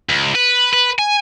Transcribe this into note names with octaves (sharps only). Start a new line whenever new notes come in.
C#2
B4
B4
G#5